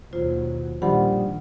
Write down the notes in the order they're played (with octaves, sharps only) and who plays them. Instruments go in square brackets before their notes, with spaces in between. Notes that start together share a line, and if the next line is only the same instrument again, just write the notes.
[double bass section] D#2 B2 F#3 [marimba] F4 C5
[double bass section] A#1 D#3 [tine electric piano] F3 G3 [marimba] D4 F#5 B5